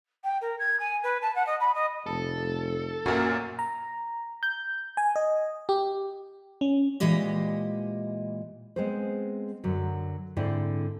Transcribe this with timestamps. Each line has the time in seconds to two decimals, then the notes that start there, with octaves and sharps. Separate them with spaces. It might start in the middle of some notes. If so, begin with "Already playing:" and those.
0.23 G5
0.41 A#4
0.59 G#6
0.79 G#5
1.03 B4
1.22 A5
1.35 F#5
1.46 D#5
1.60 B5
1.74 D#5
2.06 F1 A4
3.06 F#2 A#2 F#4 A#4 E5
3.59 A#5
4.43 G6
4.97 G#5
5.16 D#5
5.69 G4
6.61 C#4
7.00 A#2 E3 G#3 G4 D#5
8.76 G#3 B3 C4 G#4 C5
9.64 F#2 D3 F#3
10.37 G#2 D3 C4 E4 D5